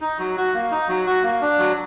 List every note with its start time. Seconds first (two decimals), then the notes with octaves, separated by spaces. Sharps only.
0.01 D#4
0.19 F#3
0.37 F#4
0.54 A#3
0.71 D#4
0.89 F#3
1.06 F#4
1.23 A#3
1.41 D4
1.59 F#3